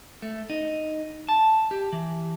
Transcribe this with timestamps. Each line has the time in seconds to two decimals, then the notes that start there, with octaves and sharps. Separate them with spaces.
0.22 A3
0.50 D#4
1.29 A5
1.71 G4
1.93 E3